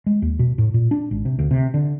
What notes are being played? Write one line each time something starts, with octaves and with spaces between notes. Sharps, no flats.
G#3
D#2
B2
A2
A#2
D4
G#1
C3
D2
C3
D3